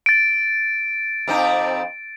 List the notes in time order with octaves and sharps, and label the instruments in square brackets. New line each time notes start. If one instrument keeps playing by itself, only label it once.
[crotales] A6 D7
[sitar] F2 C4 D#4